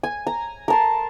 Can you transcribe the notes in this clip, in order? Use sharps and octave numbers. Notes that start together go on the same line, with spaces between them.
G#5
A#5
A#4 A5 C6